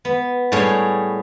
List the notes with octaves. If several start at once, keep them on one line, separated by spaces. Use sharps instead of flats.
B3
A2 G3 G#4 C#5 G5